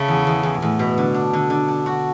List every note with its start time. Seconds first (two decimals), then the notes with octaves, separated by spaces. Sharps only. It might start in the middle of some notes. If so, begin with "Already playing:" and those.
Already playing: C#3 A3
0.08 E2
0.27 E2
0.43 E2
0.61 E2 A2
0.79 B2
0.98 D3
1.14 D4
1.33 D3
1.50 D3
1.68 D4
1.86 F#4